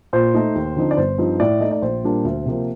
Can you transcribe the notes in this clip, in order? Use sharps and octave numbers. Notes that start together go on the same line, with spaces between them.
A#2 C5
A3 D#4
D#2
D3 F3 C4 D#4
D5
G1 C5
G2 F3 C4 D#4
A2 D5
A3 D#4 D#5
D5
A#1 C5
A#2 G3 A#3 D4
D2
C3 F3 A#3